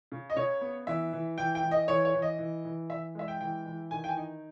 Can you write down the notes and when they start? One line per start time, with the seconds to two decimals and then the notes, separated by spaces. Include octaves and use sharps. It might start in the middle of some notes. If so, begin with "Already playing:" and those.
0.12 C#3
0.30 D#5
0.36 C#3 C#5
0.61 B3
0.87 E3 E5
1.13 E3
1.38 E3 G5
1.55 G5
1.63 E3
1.71 D#5
1.88 E3 C#5
2.05 C#5
2.14 E3
2.22 D#5
2.39 E3
2.65 E3
2.90 E3 E5
3.15 G#3 E5
3.28 G5
3.41 E3 G5
3.66 E3
3.91 D#3 G#5
4.04 G5
4.09 G#5
4.17 D#4